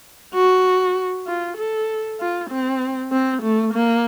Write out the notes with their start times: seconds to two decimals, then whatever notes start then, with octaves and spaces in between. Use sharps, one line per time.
0.34 F#4
1.27 F4
1.57 A4
2.20 F4
2.50 C4
3.12 C4
3.42 A3
3.73 A#3